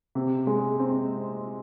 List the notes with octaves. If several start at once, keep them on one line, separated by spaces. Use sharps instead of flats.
C3
G#3
C4